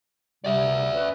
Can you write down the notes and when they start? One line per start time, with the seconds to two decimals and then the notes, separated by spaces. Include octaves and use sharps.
0.44 G2 C3 G3 D5 E5
0.94 C#4 B4